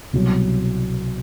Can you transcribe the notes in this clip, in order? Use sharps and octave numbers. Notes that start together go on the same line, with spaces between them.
C2 B2 F#3